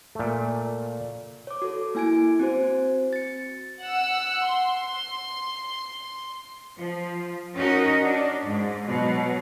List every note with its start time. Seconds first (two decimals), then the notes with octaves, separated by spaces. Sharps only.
0.15 A#2 A3
1.47 C#5 D6
1.62 F#4 A4
1.95 A#3 E4 G#5 G#6 D7
2.40 C4 F#4 C5
3.13 A6 C#7
3.81 F#5 E6
4.48 C6
6.77 F3
7.56 C#4 D#4 F#4 A#4 D#5
8.03 D4
8.46 G#2
8.85 B2 F#3